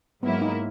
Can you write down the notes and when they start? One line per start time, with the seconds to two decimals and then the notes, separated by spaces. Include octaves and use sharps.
0.22 G#2 F#3 A#3 B3 E4
0.42 D#4